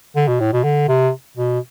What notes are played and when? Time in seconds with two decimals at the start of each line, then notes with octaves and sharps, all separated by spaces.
0.16 D3
0.28 B2
0.40 A2
0.53 B2
0.64 D3
0.88 C3
1.37 B2